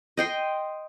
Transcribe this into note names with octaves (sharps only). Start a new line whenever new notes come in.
D#5 G5 C6